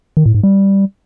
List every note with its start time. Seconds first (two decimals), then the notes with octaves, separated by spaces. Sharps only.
0.17 D#3
0.26 A2
0.35 G#2
0.43 G3